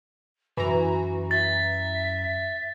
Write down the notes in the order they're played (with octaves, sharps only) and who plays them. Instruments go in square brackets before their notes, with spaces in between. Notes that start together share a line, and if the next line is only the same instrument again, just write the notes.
[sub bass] F#2 [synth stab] E3 A#5 [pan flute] F#4
[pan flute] E5 [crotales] A6